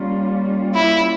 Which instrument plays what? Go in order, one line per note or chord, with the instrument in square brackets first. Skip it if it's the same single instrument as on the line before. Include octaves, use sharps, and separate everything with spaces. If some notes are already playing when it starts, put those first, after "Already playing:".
Already playing: [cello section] G3 A#3 C#4 F4
[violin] E4